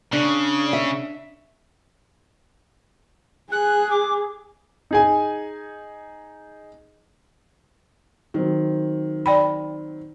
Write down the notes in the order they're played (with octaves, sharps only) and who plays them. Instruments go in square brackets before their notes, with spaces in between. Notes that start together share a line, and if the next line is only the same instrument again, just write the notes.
[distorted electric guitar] C#3 [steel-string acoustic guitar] D4
[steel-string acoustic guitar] E5
[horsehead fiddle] G#4 [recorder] F#6
[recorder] D6
[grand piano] D#4 G#4 G#5
[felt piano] D#3 F#3 C4
[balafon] D5 G5 B5